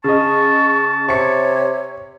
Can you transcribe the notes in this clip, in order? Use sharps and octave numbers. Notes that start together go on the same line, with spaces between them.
C#3 D#5 A5 C#6
C3 C#5 C#6 C#7